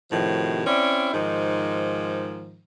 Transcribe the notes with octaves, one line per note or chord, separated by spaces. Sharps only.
A2 C3 D#3 F3 F#4
C4 C#4 E4 D5
G#2 D#3 F3 D#4